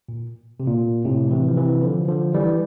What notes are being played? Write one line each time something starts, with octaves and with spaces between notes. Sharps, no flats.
A#2
C3
A#2
A2 C3
C3 E3
F3
C3 E3
D3 F3
D3 F3
E3 G3